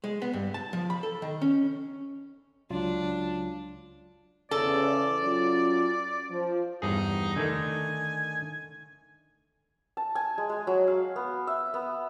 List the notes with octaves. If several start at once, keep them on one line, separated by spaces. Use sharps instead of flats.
G#3
B3
G2
A5
F3
B5
A4
D#3
C#4
C#2 F#3 D4 F4
E2 C#3 A4 D5
F#3 C#4 F4
F3
E2 G2 D#4 G#4
D3 D#3 A3 G#5
A5
G#5
G#3
G#3
F#3
F5
B3
E5
B3